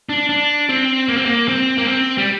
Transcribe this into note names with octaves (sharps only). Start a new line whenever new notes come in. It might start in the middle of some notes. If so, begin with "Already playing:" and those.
D4
D4
C4
A#3
C4
A#3
C4
A#3
C4
G3